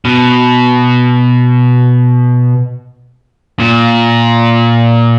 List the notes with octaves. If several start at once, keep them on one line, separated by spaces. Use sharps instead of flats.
B2
A#2